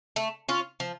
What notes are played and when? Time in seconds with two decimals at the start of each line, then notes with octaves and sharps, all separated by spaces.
0.16 A3
0.49 C#4 F4
0.80 F3